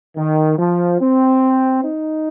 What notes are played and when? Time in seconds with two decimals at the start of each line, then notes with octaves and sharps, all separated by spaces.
0.17 D#3
0.57 F3
1.00 C4
1.82 D#4